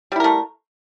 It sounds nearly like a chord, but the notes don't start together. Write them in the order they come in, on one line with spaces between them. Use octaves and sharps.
G3 E4 A#4 A3